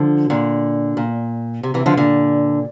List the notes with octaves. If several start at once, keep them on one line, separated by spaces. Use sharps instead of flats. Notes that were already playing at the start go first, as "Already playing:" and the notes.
Already playing: D3 F3
A#2 D3
A#2
C3
C3 E3
D3 F3
A#2 D3